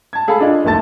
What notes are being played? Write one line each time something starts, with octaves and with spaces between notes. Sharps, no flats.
A5 G#6
G#4 A4 F5 A5 B5
D4 F4 D#5 F5
F#1 D#2 A3 A5 A6